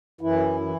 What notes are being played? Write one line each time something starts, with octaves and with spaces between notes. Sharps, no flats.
F#2 E3 E4
E3